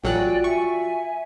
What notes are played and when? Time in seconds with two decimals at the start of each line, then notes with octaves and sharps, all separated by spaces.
0.04 A1 F#3 F4 F#4 D5 G5 G#5 F#6
0.44 E5 G#5 C#6